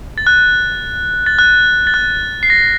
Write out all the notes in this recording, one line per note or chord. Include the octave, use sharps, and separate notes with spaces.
A6
F#6
A6
F#6
A6
F#6
C7
A#6